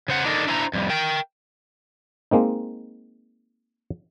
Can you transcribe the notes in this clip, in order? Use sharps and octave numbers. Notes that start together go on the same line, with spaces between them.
C#3 C5 F#5
D4 D#4 A4 A#4
D4 E4 C5 G#5 A#5
F2 G3
A#4 G5
G#3 A#3 C4 D#4